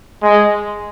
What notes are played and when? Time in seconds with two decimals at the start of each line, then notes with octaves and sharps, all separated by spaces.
0.23 G#3